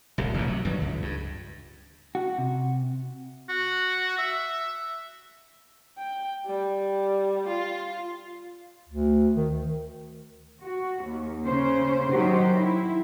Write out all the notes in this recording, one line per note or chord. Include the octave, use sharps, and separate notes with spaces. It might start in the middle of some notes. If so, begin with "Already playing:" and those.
D1 C2
E1 A1 E2 A#2
C3 F#3
G2 D#3 F3 F#3
C#2
G2
F#4
C3
F#4
E5
G5
G3
F4
D2
D#3
F#4
D#2
C#3 C#4 C5
D#3 F#3 D#4 F#4 G4 C5
E4